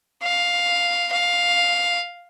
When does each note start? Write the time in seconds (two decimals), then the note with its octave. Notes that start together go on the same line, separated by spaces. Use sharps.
0.23 F5
1.12 F5